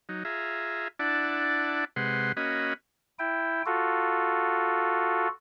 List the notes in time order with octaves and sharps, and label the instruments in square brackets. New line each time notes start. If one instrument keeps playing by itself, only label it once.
[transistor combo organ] F#3 D#4
F4 G#4 E5 A#5
D4 E4 D5 F#5 A5
C3 G#3 B4 F#5 C6
A#3 C#4 F#4 D#5 B5
[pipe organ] E4 G5
F4 F#4 A4